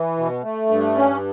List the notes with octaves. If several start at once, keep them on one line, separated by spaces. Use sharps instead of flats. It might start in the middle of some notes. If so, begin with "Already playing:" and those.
Already playing: E3
B2
A3
G2
C#4